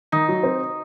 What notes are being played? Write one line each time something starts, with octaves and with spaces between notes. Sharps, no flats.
D#3 D#4
F#3
C4